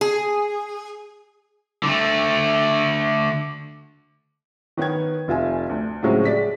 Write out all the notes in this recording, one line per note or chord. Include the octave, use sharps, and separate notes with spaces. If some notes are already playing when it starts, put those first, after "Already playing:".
G#4
D3 A3
D#3 B3 C#5 G5 G#6
F1 F4 E5 G#5
D2
A2 C#3 F3 F#3 G#3 C4
G#3 D5 B6